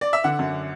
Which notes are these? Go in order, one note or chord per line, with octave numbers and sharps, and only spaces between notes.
D5
E5
D3 F#5
F#2